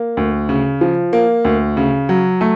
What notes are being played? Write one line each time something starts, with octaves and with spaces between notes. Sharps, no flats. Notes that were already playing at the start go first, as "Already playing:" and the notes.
Already playing: A#3
D2
C#3
F3
A#3
D2
C#3
F#3
A3